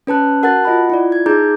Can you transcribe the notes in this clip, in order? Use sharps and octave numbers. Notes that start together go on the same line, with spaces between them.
C#4 B4 A5 F#6
F#4 A#4 F#5 A5 F#6 A6
F4 D#5 F#5 B5
E4 F4 D5
G#6
D#4 G#4 A#5 D6 G6